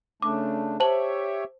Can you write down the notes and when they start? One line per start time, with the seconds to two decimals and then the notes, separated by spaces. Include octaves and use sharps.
0.22 C#3 A3 D4 D6
0.80 G4 C5 C#5 E5 A5 F#7